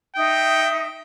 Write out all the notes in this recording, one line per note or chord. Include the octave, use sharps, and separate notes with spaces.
D#4 E5 G5 D#6